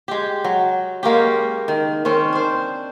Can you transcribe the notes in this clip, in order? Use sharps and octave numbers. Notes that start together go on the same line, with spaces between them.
G#3 G4
F#3
G#3 A#3 C#4 G4
D#3
D#3 C4 C#4
D4 C5